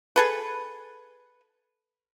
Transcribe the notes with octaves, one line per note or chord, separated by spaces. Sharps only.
G#4 A4 B4